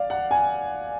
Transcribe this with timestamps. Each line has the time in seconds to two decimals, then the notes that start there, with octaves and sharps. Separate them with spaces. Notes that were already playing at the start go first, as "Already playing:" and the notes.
Already playing: D5 F5
0.10 F#5
0.31 G#5